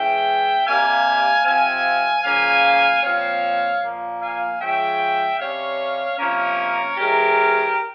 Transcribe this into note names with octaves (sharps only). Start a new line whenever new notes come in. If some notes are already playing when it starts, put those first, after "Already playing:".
Already playing: E3 G#3 C#4 E5 G5
C3 G3 A#3 F5 G#5
C3 F3 C4 F5 G#5
C#3 F3 A#3 C#4 F5 G#5
A#2 F3 C4 C#5 F5
A#2 F3 A#3
F5 G#5
F3 G#3 C#4 E5 G5
C3 G3 C#4 C#5 F5
C3 F3 A#3 C#4 A#4 C#5
E3 G#3 C#4 G4 A#4